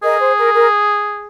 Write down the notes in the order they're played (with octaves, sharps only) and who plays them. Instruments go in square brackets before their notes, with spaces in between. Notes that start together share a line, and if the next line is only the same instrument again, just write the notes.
[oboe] G#4 [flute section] A#4 D#5
[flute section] C5
A#4
A#4